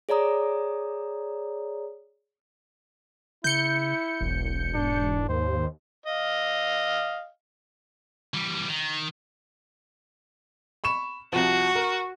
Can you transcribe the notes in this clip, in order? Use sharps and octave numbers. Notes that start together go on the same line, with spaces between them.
G#4 C#5 D5 A#5 D#6
C#3 E4 G6 C#7
E1 B1
G#2 D4
D#2 C5
D#5 F5
E3 G3
D#3
B5 C#6 E7
C2 F3 F#4
A#4